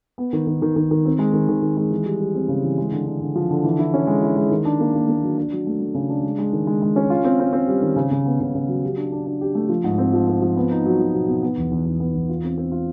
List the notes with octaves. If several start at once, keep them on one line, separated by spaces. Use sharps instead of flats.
B3
D#3
D#3
D#3
D#3
D#3
C4
G#3
D#3
D#3
D#3
G#3
E3
G3
G3
C4
C#3
E3
G#3
D3
D3
D3
F3
D3
E3
E4
C#4
G#3
E4
G#3
D#3
D4
A#3
A#3
A#3
F#3
D4
F#3
A3
A3
C#3
D4
G#3
G#3
D#3
G#3
G#3
C#4
F4
C4
C4
C4
G3
D#3
C#3
C#3
B3
C#3
C#3
F#3
G4
D4
D4
D4
G4
A3
F3
G#2
C4
F3
C4
F3
B3
D#4
F#3
F#3
B2
B2
B3
E2
E2
E2
B3
E2
F4
C4
C4
F4